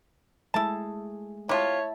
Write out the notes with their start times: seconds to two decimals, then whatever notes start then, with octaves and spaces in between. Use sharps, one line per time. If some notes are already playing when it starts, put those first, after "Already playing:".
0.54 G#3 A3 E4 A5
1.49 C3 E4 F4 C#5 E5 A5